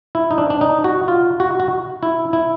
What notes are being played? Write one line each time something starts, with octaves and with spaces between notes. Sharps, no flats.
E4
D#4
D4
D4
D#4
F#4
F4
F#4
F#4
E4
E4